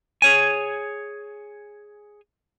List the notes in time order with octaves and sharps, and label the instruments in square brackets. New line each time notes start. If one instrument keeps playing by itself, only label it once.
[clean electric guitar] G#4 C#5 G#5